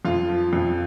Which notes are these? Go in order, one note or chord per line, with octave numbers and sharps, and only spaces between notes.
F2 F4
F3
F2